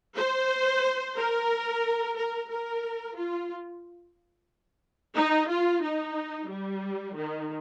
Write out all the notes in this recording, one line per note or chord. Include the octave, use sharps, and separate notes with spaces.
C5
A#4
A#4
A#4
F4
D#4
F4
D#4
G3
D#3